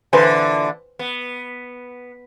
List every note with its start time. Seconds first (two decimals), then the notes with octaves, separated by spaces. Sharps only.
0.13 A#2 D3 E3 B4 C5 G#5
0.99 B3